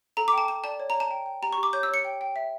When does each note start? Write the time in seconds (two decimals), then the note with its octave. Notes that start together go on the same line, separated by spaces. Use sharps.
0.17 A4 A#5
0.28 D6
0.33 G5 A5
0.48 A4 A5
0.64 D5 A5
0.80 C#5
0.90 A#5
0.95 C#5
1.00 A5
1.11 G5
1.26 G5
1.42 G4 A#5
1.53 C#6
1.58 G4
1.63 D6
1.73 C#5 G6
1.83 E6
1.88 C#5
1.94 C#7
2.05 G5
2.21 G5
2.36 E5